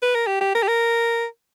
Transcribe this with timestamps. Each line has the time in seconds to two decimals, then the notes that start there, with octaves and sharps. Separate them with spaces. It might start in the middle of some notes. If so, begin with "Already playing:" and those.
0.02 B4
0.15 A#4
0.27 G4
0.41 G4
0.55 A#4
0.63 G4
0.68 A#4